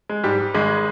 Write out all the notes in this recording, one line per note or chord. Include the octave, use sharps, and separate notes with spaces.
G#3
G#2 G3 G4
G3
G#1 G#3 G#4